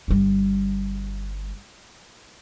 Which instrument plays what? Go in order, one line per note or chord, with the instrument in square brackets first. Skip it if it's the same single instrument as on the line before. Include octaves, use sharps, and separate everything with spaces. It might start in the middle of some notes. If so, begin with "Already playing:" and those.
[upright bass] G1 G3